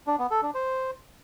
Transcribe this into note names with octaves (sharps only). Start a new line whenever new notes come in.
D4
B3
A4
D4
C5